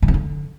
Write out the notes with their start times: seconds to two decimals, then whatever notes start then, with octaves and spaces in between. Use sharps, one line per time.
0.02 A2
0.08 C3
0.14 D3